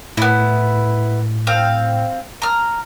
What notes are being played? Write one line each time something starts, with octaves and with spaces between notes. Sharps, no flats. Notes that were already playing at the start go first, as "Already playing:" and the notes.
A2 B3 E4
C4 F5
A#5 F6